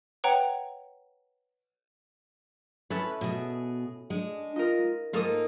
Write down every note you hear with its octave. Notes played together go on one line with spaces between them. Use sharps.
B4 C#5 F#5 G5 A#5
C#4 E4 A4 B4
B2 G#4
G#3 D4
D#4 F4 A#4
G#2 A#3 D#4 F4 A4 D#6